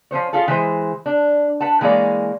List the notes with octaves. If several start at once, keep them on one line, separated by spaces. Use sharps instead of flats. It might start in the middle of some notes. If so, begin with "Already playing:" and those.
F3 C#4 C5 C#5
C#4 F4 G#4 A4
E3 G#3 C5
D4
B4 F#5 A5
E3 G#3 A#3 C#4 D5